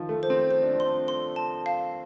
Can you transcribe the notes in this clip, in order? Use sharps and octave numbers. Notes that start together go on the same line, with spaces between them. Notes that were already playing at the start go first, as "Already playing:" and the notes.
Already playing: D#3 F3
A3
C5
C4
C5
D4
C4
D4 C6
C6
A5
F5